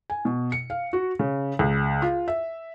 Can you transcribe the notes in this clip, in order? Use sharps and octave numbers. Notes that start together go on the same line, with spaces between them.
G#5
B2
C#7
F5
F#4
C#3
C#2
F4
E5